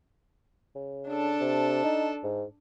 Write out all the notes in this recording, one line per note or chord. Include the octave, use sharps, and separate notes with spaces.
C#3
D4 A4
C3
D#4
G#2